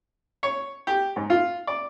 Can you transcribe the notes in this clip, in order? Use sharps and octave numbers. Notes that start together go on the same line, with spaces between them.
C#5
G4
G#2
F4
D5